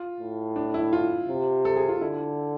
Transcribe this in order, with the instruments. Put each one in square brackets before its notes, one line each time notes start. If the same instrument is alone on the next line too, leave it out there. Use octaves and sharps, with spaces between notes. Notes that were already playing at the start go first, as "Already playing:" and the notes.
Already playing: [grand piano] F4
[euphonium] A2
[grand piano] D4
E4
F4
[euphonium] C3
[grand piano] A4
G#4
F4
[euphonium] D3 [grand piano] E4